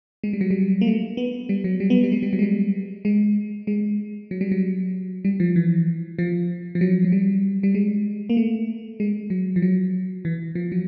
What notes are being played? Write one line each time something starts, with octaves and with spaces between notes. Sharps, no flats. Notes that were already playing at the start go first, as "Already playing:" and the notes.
G#3
G3
F#3
G3
A#3
A3
B3
G3
F#3
G3
B3
G3
G#3
G3
F#3
G#3
G3
G#3
G#3
F#3
G3
F#3
G3
F3
E3
F3
F3
F#3
F#3
G3
G3
G#3
A#3
A3
G#3
F#3
F3
F#3
E3
F3
F#3